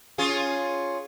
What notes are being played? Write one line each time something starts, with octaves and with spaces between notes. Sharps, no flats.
C#4 F4 G#4